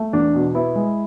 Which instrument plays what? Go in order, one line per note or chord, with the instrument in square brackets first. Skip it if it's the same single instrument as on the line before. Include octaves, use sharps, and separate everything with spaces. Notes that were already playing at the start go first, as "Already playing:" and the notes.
Already playing: [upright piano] A3
E2 D4
B2
B3 E4
G#3